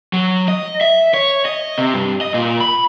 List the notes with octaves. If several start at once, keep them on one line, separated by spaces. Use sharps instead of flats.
F#3
D#5
E5
C#5
D#5
C3
G2
D#5
A#2
B5